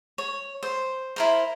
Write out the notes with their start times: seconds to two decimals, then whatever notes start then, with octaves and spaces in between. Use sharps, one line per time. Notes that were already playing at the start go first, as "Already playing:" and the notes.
0.18 C#5
0.63 C5
1.16 E4 A#4 C5